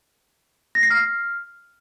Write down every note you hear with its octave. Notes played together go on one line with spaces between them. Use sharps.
A#6
C7
F6